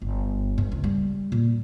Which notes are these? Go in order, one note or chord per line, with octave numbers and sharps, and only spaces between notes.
G1
G2
C#2
G3
A#2